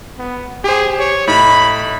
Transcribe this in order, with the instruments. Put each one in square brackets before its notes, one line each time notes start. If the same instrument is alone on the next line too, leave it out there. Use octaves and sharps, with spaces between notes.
[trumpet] B3
[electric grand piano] G4 C5 [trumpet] G#4
[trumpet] C#5
[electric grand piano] A2 D#4 [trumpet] B5